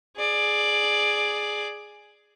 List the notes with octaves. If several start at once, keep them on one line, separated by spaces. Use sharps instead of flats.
G#4 D5